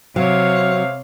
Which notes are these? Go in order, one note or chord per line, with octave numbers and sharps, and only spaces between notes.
C3 F#3 C5 C#5 E5 F5